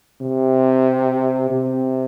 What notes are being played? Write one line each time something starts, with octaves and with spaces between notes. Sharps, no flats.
C3
C3